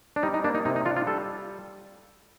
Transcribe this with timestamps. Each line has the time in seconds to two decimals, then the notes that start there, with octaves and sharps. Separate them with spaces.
0.16 D4
0.23 G3 D#4
0.34 D#4
0.44 A#3 D4
0.55 D#4
0.65 C3 D#4
0.76 D#4
0.85 D4 F4
0.96 F4
1.07 G3 A4